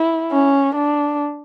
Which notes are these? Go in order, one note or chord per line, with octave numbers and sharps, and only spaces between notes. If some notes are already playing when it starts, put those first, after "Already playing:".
Already playing: E4
C#4
D4